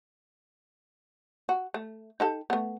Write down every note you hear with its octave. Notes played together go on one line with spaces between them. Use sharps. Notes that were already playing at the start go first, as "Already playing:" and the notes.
F#4
A3
D#4 G4 A4
A3 B3